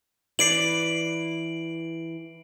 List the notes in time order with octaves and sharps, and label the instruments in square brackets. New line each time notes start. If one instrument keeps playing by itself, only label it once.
[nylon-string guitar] E3 B4 D5 [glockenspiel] C7 D7 F#7